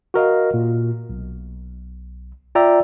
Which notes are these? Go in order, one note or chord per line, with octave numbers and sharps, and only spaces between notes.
F#4 A#4 D#5 F5
A#2
B1
F4 D5 E5 G5 A#5 E6